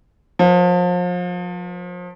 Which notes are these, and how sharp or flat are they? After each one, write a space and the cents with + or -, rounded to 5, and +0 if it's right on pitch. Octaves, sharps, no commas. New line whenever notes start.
F3 +35 B4 -20